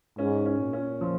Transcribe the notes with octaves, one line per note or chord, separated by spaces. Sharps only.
G#2 C#4
C#4
A#2
C#4
F3